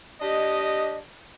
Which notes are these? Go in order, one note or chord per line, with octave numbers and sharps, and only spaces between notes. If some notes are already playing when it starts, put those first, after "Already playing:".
D4 G4 D#5